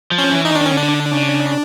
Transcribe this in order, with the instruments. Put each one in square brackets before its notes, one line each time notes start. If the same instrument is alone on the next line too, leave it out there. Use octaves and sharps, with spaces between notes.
[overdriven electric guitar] F3
[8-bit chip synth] C#4
[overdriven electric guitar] E3
[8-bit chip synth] D#4
[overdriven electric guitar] D#3 [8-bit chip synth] D4
[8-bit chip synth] C#4
[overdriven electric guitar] D3 [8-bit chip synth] D4
[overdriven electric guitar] C#3